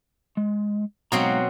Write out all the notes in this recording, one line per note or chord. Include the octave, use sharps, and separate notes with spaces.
G#3
G#2 B2 F#3 C4 F5 A#5